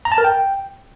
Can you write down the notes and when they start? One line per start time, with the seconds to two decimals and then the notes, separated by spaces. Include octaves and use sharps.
0.05 A#5
0.12 A5
0.18 A#4
0.24 G5